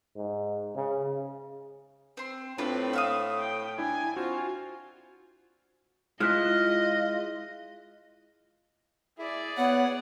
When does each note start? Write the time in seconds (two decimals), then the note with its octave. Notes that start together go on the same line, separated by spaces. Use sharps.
0.16 G#2
0.76 C#3
2.17 C4 C6
2.58 A2 C4 D4 F4 B4
2.93 E5 F5 D#6
3.39 G5
3.78 D4 E4 G#5
4.17 C4 F4 F#4
6.20 G#3 E4 F4 D#5 F6 F#6 B6
9.18 E4 G#4 D5
9.57 B3 C#5 F#5